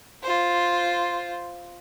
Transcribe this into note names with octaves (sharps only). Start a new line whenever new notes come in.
F4 C5